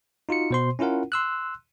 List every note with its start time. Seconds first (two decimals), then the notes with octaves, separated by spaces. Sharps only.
0.29 D#4 F4 F#4 C#7
0.51 B2 C5 C6
0.79 C#4 E4 F4 A#4 F#5
1.12 C6 E6 F#6